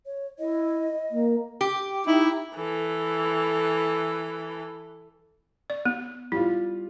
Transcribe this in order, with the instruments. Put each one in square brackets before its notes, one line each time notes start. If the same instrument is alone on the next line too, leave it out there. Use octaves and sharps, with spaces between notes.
[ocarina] C#5
[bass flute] E4 [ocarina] D#5
[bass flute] A#3
[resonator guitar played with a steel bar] G4
[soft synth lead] D#4 [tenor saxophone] E4
[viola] E3 A4
[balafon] D5
B3
[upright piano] G3 F4 [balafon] E4